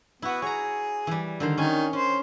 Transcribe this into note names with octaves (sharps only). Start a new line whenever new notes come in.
B3 E4 F#4
G#4 C#5 A#5
E3 G3
D3 D#3 C5
D#3 C#4 G#5
C#4 C5